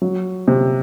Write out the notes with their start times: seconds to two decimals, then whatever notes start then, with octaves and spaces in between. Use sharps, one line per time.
0.02 F#3
0.48 C3